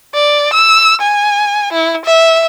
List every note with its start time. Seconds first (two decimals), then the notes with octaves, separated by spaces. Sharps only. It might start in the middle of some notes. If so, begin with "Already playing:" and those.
0.14 D5
0.53 E6
1.01 G#5
1.73 E4
2.05 E5